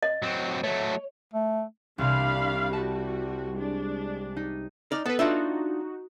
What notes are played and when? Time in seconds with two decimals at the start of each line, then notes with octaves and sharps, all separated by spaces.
0.03 D#5
0.22 F#3 C4
0.64 F#3 A3 C#5
1.34 A3
1.98 C2 C3 D4 F5 B5
2.73 G3 F#4 A5
3.54 G#3 D4
4.37 D#4
4.92 D#4 D5 F6
5.06 B3 A4 B4
5.19 D4 D#4 F4 F#4 E5